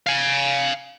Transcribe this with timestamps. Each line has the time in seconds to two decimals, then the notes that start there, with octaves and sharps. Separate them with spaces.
0.07 F5 G#5